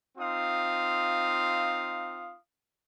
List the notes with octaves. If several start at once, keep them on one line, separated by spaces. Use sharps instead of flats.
C4 D#4 F4 F5 D#6